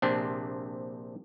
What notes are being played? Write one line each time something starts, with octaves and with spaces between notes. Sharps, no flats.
A#1 C3 C4 D4